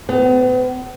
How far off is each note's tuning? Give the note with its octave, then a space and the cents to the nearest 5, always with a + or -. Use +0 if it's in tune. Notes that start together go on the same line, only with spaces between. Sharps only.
B3 +40